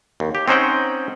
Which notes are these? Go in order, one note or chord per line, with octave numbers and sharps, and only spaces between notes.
D#2
G4
C4 C#4 D#4 C5 F#5 G5